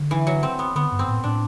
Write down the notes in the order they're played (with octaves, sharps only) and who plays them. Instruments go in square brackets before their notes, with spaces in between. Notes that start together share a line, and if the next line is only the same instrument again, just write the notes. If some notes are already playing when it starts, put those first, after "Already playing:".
Already playing: [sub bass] D3
[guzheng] E3
F#3
C4
B3
[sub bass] D3 [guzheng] B3
[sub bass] G2
[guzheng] C4
[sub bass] A2
[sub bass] A2 [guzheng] D4